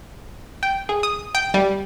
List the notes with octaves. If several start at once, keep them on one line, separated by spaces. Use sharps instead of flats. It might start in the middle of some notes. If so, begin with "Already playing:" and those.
G5
G#4
D#6
G5
G3